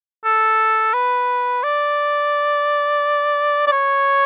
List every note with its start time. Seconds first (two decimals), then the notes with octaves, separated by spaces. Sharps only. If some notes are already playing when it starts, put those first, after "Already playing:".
0.24 A4
0.93 B4
1.63 D5
3.67 D5
3.72 C#5